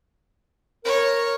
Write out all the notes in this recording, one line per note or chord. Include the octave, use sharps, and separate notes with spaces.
A#4 C#5